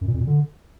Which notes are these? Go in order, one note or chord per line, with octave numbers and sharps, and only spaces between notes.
F#2
A#2
F2
A#2
D3